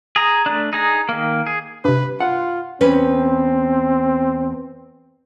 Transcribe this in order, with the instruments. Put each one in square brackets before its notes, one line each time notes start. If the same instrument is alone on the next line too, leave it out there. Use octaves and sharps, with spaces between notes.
[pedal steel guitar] G#4 A#5
A3 D4
D#4 G#4 A#5
D#3 A#3
G#4
[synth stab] G2 C3 [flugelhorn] B4
[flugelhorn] F4 [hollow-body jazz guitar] F#5
[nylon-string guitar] E2 C#4 B4 [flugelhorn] C4